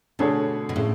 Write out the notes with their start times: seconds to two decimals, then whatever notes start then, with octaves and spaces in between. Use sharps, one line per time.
0.19 B2 D3 A3 D4 G#4 C#5
0.69 B2
0.76 A2 C#3 G#3